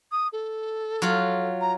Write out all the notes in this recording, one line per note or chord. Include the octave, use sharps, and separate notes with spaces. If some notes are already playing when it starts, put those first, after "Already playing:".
D#6
A4
F#3 F4
A#5